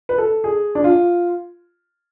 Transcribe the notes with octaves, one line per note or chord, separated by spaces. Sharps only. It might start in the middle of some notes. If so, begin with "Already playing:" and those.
B4
A4
G#4
D4
F4